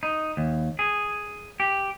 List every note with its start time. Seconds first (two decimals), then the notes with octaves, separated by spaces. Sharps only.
0.03 D#4
0.37 D#2
0.79 G#4
1.60 G4